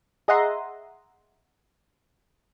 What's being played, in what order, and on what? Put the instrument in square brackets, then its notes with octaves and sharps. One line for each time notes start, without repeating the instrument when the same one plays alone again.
[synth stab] G#4 D#5 E5 F#5 A#5 C6